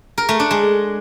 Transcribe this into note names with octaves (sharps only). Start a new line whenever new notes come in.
A#4
A3
D4
G#3